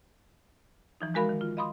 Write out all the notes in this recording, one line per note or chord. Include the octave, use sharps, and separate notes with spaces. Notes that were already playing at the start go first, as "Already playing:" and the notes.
E3 F3 D#4
E3 G#3 F#4 A#4 F5 B5
D#3
F4
D#5 F5 B5 C6 D#6